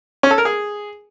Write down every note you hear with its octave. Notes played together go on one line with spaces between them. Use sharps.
C#4
A4
A#4
G#4